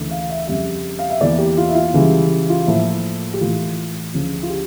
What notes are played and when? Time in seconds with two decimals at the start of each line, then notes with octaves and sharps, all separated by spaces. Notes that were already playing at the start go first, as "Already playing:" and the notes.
Already playing: D2 C#3 E3 A3
0.11 F5
0.30 E5
0.47 F2 C#3 G3 E5
0.99 F5
1.10 E5
1.21 E2 E3 A#3 D5
1.38 G4
1.57 F4
1.69 E4
1.75 F4
1.94 C#2 C#3 E3 G3
2.49 F4
2.67 A2 F3 A#3 E4
3.33 G4
3.41 A2 E3 A3 F4
4.14 D2 C#3 F3
4.42 F4
4.50 G4